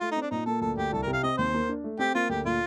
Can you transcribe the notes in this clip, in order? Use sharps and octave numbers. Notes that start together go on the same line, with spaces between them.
A3 F4
D#4
C4
D4
A#2 D#4
A#3 A4
D2 A4
D2 G4
C2 A4
A#4
C3
F5
C4 D#5
D#2 C5
A#3
D4
A3
C4 G4
A#3 F4
D2 G4
A#2 F4